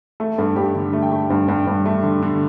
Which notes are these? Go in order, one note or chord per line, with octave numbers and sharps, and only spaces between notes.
A3 A4
G2 A4
G2 G4
D3
A3
G5
A3
G2
G2
G2
A3
D3
D3